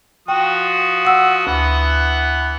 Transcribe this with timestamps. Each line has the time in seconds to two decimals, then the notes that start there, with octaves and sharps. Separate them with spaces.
0.28 F3 F#4 G5 D#6
1.05 F#5 E6
1.47 D2 E3 B3 F#5